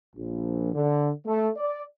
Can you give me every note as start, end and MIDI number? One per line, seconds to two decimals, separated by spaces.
0.15 0.72 34
0.74 1.11 50
1.25 1.49 57
1.57 1.83 74